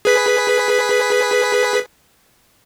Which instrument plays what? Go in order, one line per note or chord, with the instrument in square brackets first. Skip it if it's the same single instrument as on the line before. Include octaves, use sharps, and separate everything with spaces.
[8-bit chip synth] G#4 B4 B6